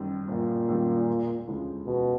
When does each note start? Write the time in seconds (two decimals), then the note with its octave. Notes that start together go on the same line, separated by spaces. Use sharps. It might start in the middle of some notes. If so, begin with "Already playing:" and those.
Already playing: G1 F#2 D#3 G3
0.28 G1 A#2
0.68 F#2 D#3 G3
1.08 E1
1.47 D2 C#3 F3 G#3
1.87 E1 B2